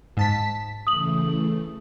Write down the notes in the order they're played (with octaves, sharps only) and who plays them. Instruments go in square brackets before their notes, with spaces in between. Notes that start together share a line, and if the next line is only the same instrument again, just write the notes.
[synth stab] G#2 A5 B6
[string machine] C#3 E3 A3 [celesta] D#6 F#7